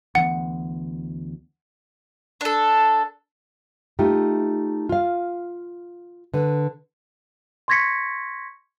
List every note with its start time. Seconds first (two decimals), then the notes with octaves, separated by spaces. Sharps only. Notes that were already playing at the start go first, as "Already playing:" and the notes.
0.15 D2 E3 B3 F#5
2.41 D4 A4
3.99 A3 D#4 F4 G4
4.89 F4 F5
6.34 D3 B4
7.68 C6 C#6 G#6 A#6 B6 C#7